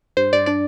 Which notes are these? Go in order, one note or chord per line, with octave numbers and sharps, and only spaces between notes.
G2 C5
G2 D5
D4 D5